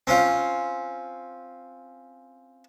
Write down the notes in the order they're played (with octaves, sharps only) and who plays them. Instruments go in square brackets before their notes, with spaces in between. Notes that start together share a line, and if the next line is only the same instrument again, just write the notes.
[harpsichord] C4 C#4 F4